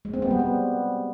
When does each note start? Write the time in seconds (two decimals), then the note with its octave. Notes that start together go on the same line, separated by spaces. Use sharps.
0.05 G#3
0.14 C4
0.22 B3
0.31 G3
0.39 B3